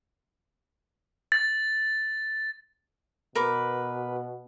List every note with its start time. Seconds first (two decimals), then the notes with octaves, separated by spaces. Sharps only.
1.32 A6
3.35 B2 A#4 B4 D6